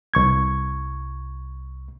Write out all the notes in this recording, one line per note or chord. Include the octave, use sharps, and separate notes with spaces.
C2 C#6 G#6